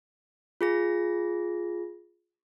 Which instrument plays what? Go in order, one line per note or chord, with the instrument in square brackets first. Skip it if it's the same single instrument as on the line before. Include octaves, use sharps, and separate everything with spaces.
[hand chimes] F4 G#4 A#6